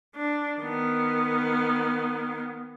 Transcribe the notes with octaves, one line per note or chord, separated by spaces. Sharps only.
D4
D#3 B3